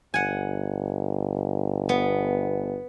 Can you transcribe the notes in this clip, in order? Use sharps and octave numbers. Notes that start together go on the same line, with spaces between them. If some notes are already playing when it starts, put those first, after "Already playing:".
G1 F#5 G#5
B3